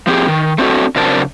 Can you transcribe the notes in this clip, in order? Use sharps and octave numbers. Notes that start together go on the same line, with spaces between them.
F3 C4 G4 G#4
D#3
A3 C4 D4 F4 F#4 A4
C#3 F#3 C4 D4 A#4 A5